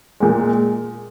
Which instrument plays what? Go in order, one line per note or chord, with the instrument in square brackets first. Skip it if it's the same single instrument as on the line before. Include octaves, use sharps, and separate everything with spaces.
[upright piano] A#2 G#3